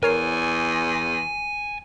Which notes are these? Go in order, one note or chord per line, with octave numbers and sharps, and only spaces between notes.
E2 A#4 C#5 G#5 C7